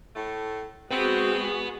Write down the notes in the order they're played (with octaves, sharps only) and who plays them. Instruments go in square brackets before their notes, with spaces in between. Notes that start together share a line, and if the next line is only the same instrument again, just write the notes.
[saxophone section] A2 A3
[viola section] G#3 F#4 G#4 [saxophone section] C4 [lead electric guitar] B4 F#5